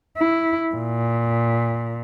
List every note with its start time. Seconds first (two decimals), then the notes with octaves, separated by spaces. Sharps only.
0.18 E4
0.75 A#2